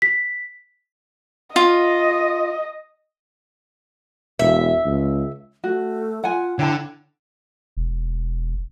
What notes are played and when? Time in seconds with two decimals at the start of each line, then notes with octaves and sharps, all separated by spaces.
0.02 B6
1.56 F4 D#5
4.39 E1 E5
4.86 C#2
5.64 A3 F#4
6.24 F4 F#5 G#5
6.59 D3 E4 C#5 G5 A5
7.77 E1